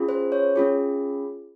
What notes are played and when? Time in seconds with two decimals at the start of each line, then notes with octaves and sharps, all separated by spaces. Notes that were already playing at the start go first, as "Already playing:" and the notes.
Already playing: C#4 F4 G#4
0.09 C5
0.32 C#5
0.56 C#4 F4 G#4